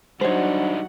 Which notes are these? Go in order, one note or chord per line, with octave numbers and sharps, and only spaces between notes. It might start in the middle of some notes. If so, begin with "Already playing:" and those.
F#3 G3 D4 D#4 C5 C#5 F#5